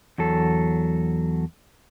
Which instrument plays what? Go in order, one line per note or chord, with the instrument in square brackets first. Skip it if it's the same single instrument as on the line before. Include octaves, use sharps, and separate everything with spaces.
[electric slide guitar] E2 F#3 A4